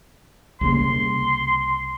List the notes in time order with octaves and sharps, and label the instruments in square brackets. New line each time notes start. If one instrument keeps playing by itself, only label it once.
[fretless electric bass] C2 C#3 A#3 [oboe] C6